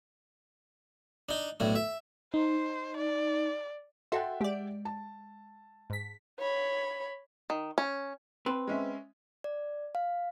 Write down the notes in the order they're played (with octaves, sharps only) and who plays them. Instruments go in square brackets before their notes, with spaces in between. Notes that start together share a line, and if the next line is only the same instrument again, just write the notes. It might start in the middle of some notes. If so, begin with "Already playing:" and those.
[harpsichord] D4 D#4
B1 A2 D4
E5
[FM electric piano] D#4 [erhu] C5
[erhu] D5
[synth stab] F#4 A4 C6 [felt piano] E5 F#5 G5
[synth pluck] G#3 [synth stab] G4 D5
[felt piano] A5
[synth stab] G#2 B6
[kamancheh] C#5 B5
[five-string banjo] D#3
C#4
[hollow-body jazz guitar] C4 B4
[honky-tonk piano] G#3 C#4 E5
[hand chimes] D5
F5